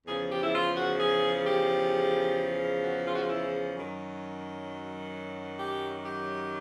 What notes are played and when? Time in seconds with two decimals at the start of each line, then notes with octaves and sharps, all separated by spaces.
0.07 E2 C#3 F3 G#4
0.30 G4
0.42 E4
0.53 F4
0.75 F#4
0.98 G#4
1.44 G4
2.83 F#4
3.06 F4
3.13 F#4
3.20 F4
3.28 E4
3.75 F#2 D#3 F#3
5.59 G4
6.05 G4